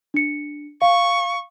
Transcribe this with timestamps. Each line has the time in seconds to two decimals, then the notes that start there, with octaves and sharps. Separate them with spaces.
0.14 D4 C#7
0.82 F5 C#6